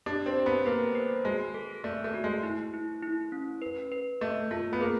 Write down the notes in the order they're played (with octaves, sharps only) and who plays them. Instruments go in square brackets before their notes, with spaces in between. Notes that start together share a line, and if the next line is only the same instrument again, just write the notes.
[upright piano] D4 [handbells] G4
[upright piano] C4
[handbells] G4
[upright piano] B3
[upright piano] A#3 [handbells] B4
[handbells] B4
[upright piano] G#3 [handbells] F#4
[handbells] A4
[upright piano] A3 [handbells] D5
[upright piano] A3
[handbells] F#4
[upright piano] G#3
[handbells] E4
E4
E4
C#4
B4
B4
[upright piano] A3 [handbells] D#5
[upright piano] A3 [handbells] F4
[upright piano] B3
[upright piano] A#3 [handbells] G#4